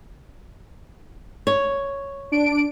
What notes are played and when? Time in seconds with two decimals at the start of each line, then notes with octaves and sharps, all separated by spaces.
1.47 C#5
2.32 D4 D7